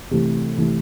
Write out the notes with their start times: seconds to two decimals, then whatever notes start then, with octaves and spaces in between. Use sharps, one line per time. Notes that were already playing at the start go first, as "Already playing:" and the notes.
0.11 C3 E3 A3
0.57 C3 E3 A3